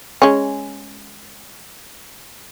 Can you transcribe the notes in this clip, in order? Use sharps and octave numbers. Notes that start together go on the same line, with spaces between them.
G#3 C#4